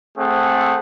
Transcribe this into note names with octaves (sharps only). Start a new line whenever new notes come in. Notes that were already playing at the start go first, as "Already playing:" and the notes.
A3 C4 G#4 F#5